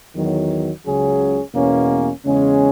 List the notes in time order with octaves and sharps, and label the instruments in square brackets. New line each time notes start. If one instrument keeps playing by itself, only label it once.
[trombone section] E2 D#3 F#3
C#2 C#3 F#3 C#4 G#4
E2 B2 A#3 C#4
E2 C#3 G#3 C#4